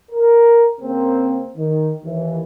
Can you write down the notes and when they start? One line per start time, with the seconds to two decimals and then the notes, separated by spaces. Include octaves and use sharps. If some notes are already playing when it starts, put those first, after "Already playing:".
0.11 A#4
0.81 C#3 A#3 C4
1.57 D#3
2.04 D#2 E3